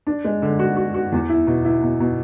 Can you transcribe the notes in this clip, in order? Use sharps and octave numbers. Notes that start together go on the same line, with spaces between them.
D4
G#3
D3
F#4
F#4
F#4
E2
E4
B2
E4
B2
B2